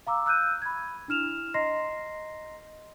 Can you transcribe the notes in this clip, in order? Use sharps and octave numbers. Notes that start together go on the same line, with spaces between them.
F5 A#5 D6 E6
E6 F#6 G6 D#7
B5 G#6
D4 E4 F6 E7 F7
D#5 A#5 C6 A#6 C7